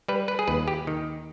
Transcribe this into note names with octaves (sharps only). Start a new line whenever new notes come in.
G3 B4
B4
G#4
D#2 B4
G4
D#3